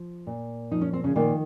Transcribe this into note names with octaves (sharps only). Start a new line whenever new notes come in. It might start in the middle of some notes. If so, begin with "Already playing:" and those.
Already playing: F3
A#2
F3 D#4
C#4
C4
C#3 C#4
A#2 D#3 A#3